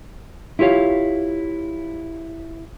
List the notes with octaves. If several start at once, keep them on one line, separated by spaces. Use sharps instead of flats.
E4 F4 G4 C#5 F5